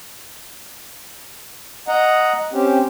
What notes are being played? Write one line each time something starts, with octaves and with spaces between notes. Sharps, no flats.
D#5 F#5 A#5
C4 C#4 G4